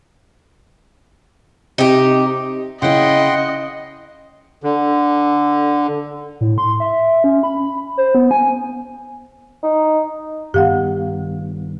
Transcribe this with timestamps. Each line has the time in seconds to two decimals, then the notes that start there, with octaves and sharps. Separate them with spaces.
1.78 C3 D#4 G4
2.82 C#3 E4 D#5 F#5 G5 C6
4.63 D3
6.41 A2
6.58 C6
6.80 E5
7.24 C#4
7.43 B5
7.97 C5
8.15 B3
8.31 G#5
9.63 D#4
10.54 G2 D#3 B3 G4 F5 F#5